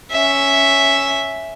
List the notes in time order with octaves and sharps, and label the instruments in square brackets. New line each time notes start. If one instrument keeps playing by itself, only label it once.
[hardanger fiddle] C#4 E5